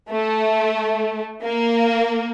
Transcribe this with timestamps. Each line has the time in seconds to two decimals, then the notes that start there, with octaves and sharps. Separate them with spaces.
0.11 A3
1.43 A#3